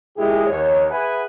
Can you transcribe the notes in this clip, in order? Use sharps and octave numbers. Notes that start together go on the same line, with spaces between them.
A#2 G#3 E4 G4 G#4
D#2 C#5
G#4 B4 E5 F#5 G#5